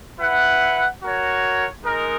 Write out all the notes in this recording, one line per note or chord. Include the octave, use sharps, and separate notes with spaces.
E4 B4 F#5
F#4 A#4 C#5
G#3 D#4 A#4